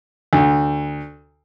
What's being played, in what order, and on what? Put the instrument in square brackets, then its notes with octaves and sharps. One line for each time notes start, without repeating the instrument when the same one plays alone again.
[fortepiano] D2